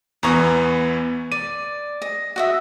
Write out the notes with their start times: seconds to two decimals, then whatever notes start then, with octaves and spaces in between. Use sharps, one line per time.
0.23 E2 E3 B3 A#5 C#6 D#6
1.32 D5 D#7
2.02 D#5
2.36 F#4 D#5 E5